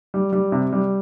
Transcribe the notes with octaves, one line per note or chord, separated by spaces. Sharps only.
G3
G3
C3
G3